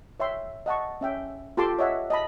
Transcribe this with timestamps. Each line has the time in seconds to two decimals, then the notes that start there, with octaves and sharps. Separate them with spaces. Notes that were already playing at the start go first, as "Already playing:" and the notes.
0.20 C#5 E5 G5 C6
0.66 D#5 F#5 A5 C#6
1.01 C#4 E5 G5
1.57 F4 G4 A4 A5 C6 D6
1.79 C#5 D#5 E5 F#5
2.10 D#5 A5 B5